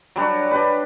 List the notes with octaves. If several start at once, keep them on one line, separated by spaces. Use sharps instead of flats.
F#3 G3 D4 F#4
D4 G4 B4